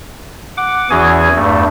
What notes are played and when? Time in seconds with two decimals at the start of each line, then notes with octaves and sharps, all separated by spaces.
0.57 F#5 D6
0.90 E2 E3 C#4 F#4 G#4 G#5
1.36 E2 G2 A3